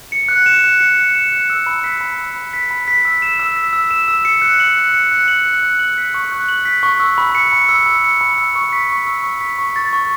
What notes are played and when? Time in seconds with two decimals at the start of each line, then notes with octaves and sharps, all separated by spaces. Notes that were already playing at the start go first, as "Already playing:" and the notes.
0.12 C#7
0.29 F#6
0.46 E7
0.64 F#6
0.80 C#7
0.97 F#6
1.15 E7
1.32 F#6
1.50 E6
1.66 B5
1.84 B6
2.01 B5
2.18 E6
2.36 B5
2.53 B6
2.71 B5
2.88 B6
3.05 E6
3.22 E7
3.40 E6
3.56 B6
3.73 E6
3.91 E7
4.08 E6
4.25 C#7
4.42 F#6
4.60 F#7
4.77 F#6
4.94 C#7
5.12 F#6
5.28 F#7
5.45 F#6
5.63 F#6
5.79 F#7
5.98 B6
6.14 C#6
6.32 F#6
6.48 F#7
6.65 B6
6.83 C#6
7.00 E6
7.18 B5
7.35 C#7
7.53 B5
7.69 E6
7.86 B5
8.04 C#7
8.21 B5
8.38 E6
8.55 C#6
8.73 B6
8.90 C#6
9.07 E6
9.23 C#6
9.41 B6
9.59 C#6
9.76 A6
9.93 C#6